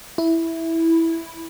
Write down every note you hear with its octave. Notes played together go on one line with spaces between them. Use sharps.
E4